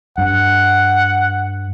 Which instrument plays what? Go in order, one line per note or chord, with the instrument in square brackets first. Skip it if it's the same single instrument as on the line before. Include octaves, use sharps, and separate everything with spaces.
[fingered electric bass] G2 [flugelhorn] F#5